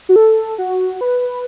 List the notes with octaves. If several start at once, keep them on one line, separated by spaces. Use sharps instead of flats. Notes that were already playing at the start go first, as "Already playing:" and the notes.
F#4
A4
F#4
B4